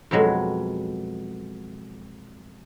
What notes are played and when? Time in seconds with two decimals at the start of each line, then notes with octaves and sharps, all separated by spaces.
0.11 F2 B2 F#3 G#3 B4